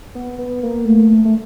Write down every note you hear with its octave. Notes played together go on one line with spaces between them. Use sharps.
B3
B3
A#3
A3
A3